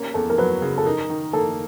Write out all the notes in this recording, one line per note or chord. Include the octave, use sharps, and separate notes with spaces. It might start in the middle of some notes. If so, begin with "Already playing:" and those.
Already playing: A#3 C#4
E2 A4
A#4
F#3 B4
C#3
A4
D#4 A#4
D#3
A#3 A4